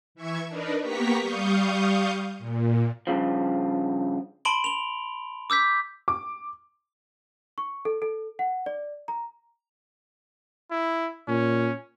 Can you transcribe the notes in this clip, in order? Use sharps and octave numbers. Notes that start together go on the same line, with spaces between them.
E3 E5 C#6 G#6
D4 D#4 A#4 B4
A#3 B3 G4 A#5 C#6 B6
G3 F5 C#6 D#6 G6
A#2
G2 C#3 F3
A5 B5 C6 D7 F#7 G7
F7 G7
D6 E6 G6 B6
D6
C#6
A4
A4
F#5
D5
A#5
E4
A#2 C#4